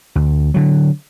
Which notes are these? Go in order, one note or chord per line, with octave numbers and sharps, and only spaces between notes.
D2
D3 F#3